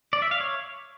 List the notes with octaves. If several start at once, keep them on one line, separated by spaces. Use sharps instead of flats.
D5
E5
F5
C#5